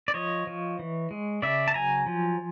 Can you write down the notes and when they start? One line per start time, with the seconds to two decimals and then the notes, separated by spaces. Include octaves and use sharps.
0.08 D5
0.14 F3 C#5 D#5
0.47 F3
0.79 E3
1.11 G#3
1.42 C#3 D5 E5
1.68 A5
1.74 F#3 G#5 A#5
2.06 F3